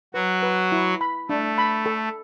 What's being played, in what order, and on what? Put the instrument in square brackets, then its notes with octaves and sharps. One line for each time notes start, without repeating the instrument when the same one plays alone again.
[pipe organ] F#3 F#4 [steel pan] B4
[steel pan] B4
E4
B5
[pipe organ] A3 [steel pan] D4
[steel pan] B5
A4